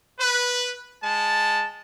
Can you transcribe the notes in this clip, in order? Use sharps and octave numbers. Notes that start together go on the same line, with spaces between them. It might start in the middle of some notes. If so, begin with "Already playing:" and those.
B4
G#3 A5